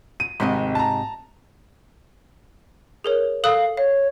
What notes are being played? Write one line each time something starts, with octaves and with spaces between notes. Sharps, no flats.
D#7
G#1 G#2 C3 D#5
A5 A#5
G#4 A#4 C#5
A4 F5 D#6 F#6
C#5 F5